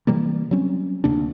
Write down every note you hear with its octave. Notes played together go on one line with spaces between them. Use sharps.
C3 E3 G3 A#3
F#3 G3 C4 C#4
D2 C3 A#3 D4